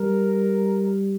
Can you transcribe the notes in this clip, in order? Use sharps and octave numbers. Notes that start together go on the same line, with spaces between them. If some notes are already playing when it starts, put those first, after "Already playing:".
Already playing: G3 A#4